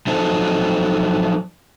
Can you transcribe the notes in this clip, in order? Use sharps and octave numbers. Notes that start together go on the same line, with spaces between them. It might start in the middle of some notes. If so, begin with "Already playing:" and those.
F3 F#3 D#4 A4 C5